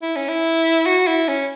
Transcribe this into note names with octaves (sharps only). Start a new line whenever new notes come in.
E4
C#4
E4
F#4
E4
C#4